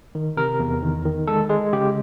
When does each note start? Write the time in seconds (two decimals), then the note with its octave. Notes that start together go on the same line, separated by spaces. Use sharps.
0.15 D#3
0.37 C3 A#4
0.60 E2
0.82 D#3
1.05 D#3
1.27 G#3 A4
1.49 G#3 G#4
1.73 C#3 G4